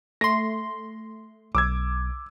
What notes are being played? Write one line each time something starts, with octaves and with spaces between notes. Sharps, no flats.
A3 C6 A#6
B1 D6 E6 G#6